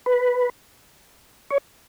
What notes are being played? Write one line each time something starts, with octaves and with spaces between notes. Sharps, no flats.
B4
C#5